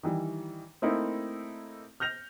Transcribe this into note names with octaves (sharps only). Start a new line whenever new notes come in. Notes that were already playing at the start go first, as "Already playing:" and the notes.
D#3 E3 G3
A3 A#3 C4 D#4 E4
F6 G6 A#6 F7